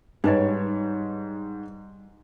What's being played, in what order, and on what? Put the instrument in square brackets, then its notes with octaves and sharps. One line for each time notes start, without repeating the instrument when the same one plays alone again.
[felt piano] G#2 G4 C#5 [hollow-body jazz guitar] G3 [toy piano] D#4 B4 D#5